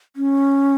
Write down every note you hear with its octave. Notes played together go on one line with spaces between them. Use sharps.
C#4